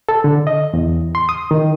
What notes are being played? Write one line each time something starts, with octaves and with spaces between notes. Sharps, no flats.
A4
D3
D#5
E2
C6
D#6
D#3